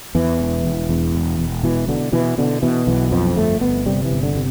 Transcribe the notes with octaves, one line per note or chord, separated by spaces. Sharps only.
E2 E3
E1
E1
E2
E1
E1
B2 E3
B2 D3
B2 E3
B2 D3
B2 E3
B1 E3
F2 F3
G1 A3
G1 B3
C3 G3
E3
G1
D3
C3